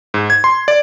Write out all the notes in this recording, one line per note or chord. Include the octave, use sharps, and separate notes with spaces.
G#2
G#6
C6
D5